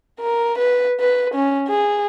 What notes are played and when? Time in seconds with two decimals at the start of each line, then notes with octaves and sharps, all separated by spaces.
0.20 A#4
0.58 B4
1.00 B4
1.34 C#4
1.68 G#4